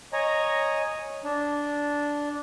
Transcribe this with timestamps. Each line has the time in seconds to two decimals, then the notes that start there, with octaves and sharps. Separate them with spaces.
0.13 C#5 D#5 G#5 A#5
1.24 D4